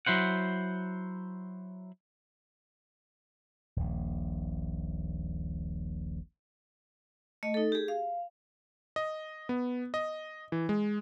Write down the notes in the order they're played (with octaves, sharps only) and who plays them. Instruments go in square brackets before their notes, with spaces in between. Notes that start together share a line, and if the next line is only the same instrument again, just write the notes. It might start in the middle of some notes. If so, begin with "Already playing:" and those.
[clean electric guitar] F#3 E4 C5 F#5
[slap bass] D#1 A#1
[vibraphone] A3 D#5
D#4 A4
G4 G#4
F5
[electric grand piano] D#5
B3
D#5
E3
G#3